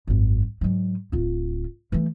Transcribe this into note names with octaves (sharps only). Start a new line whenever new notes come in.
G#1 F#2
G#2 F#3
D1 F4
E3 A3